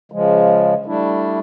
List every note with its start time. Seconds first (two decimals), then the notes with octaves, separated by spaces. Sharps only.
0.12 C#3 F3 G#3
0.86 G3 A3 D4 E4